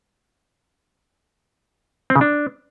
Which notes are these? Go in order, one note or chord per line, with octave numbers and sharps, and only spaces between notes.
C4
C#3
D4